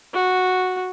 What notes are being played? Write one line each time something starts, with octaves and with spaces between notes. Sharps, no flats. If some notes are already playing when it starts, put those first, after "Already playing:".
F#4